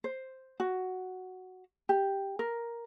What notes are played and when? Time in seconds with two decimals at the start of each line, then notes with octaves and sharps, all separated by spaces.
0.04 C5
0.60 F#4
1.89 G4
2.39 A#4